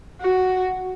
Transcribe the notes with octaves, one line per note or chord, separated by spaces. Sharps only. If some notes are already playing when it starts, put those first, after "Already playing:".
F#4